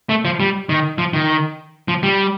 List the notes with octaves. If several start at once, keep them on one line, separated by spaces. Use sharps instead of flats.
A3
F3
G3
D#3
F3
D#3
F3
G3